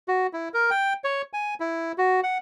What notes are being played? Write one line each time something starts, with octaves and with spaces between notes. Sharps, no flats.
F#4
E4
A#4
G5
C#5
G#5
E4
F#4
F#5